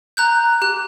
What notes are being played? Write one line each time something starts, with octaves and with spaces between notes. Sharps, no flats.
A#5 F#6 G6
G4 F#6